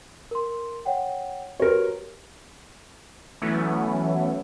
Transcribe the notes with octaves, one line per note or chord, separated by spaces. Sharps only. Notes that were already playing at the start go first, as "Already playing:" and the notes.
A#4 C6
C#5 F#5 G5
F#4 G4 A#4 B4 C#5
E3 F#3 A3 B3 C#4 E4